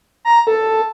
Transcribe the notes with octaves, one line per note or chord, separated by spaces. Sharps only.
A#5
A4